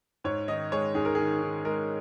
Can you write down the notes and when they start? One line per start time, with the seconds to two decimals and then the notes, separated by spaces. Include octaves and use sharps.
0.24 G#2 C#5
0.48 D#3 D#5
0.72 G#3 C#5
0.95 G#2 G#4
1.05 A#4
1.15 D#3 G#4
1.42 D#3
1.65 G#3 A#4